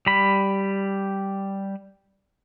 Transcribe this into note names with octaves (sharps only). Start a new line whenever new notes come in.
G3 B5